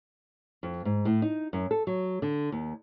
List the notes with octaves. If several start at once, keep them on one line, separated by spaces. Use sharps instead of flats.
F2
G#2
A2
D#4
F#2
A4
F#3
D3
D#2